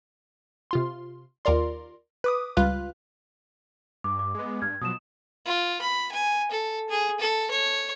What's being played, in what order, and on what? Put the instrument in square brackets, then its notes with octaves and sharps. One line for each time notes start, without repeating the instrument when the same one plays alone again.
[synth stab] C3 F4 C6
D#2 F4 A#4 D5 C6
B4 D6 D#6
C#2 G3 F4 B4 F5 F#6
[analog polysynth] G2 [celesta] D6
[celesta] D6
[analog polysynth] G#3 B3
[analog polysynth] G2 [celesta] F6 G#6
[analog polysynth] B2 F3 F#3 [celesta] D#6 E7
[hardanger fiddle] F4
B5
G#5
A4
G#4
A4
C#5